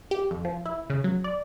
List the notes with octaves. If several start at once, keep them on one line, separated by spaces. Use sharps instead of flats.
G4
F2
F3
E4
C#3
F#3
D5